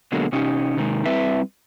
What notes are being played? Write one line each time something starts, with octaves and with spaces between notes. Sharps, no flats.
B2 D3 F#3 G#3 A#3
C3 C#4 D#4 G4
C3 D#3 G#3
G3 C4 E4 B4 E5